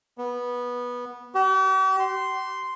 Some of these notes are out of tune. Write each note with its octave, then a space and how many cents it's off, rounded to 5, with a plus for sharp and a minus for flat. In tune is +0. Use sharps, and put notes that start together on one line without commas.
B3 -15
G4 -45
C6 -5